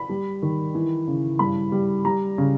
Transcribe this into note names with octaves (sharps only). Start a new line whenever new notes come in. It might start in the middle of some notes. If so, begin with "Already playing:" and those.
Already playing: B5
G3
D#3
E3
C#3
G2 B5
G3
G3 A#5
C#3